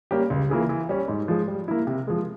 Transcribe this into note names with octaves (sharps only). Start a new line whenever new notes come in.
G3 A#3 C#4 G4
C#2
C#3 E3 A#3 F4
E3
G3 C#4
G#2
F3 G#3
G3
A#3 E4
C3
F3 G#3